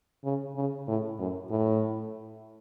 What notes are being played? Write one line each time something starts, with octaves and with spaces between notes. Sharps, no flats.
C#3
C#3
A2
F#2
A2